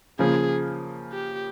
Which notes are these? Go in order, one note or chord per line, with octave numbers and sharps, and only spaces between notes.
C#3 F3 A#3 G#4
G4